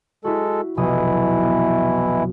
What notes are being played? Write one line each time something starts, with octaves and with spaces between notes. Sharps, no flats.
G#3 E4 F#4 A4
F1 B1 B2 E3 E4 D#6
B3